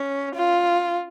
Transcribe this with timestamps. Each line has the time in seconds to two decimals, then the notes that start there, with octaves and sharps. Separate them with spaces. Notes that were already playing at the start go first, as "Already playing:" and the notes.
Already playing: C#4
0.35 F4